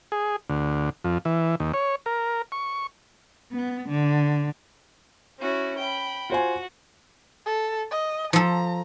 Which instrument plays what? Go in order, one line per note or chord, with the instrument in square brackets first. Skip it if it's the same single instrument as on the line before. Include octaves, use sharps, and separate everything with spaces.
[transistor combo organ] G#4
D2
F2
E3
D#2
C#5
A#4
C#6
[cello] B3
D3
[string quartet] C#4 E4 F#4
G5 B5
[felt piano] F4 C5 G#5 [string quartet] F#4
[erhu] A4
D#5
[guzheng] F3 A4 [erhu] A#5